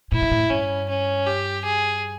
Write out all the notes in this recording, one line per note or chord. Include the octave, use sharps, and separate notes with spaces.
A2 E4
G#2
A2
G2 C#4
C#4
G4
G#4